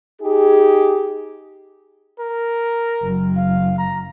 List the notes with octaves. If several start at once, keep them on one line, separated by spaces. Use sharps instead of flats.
D#4 G4 G#4
A#4
F#1 F#3
F5
A#5